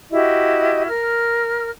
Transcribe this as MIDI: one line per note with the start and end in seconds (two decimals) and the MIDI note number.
0.11 0.86 64
0.11 0.86 66
0.11 0.86 67
0.11 0.86 75
0.88 1.70 70
0.88 1.70 89